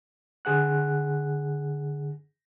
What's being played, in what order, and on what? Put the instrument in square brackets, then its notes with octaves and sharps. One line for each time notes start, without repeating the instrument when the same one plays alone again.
[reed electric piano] D3 G#4 F#5 F#6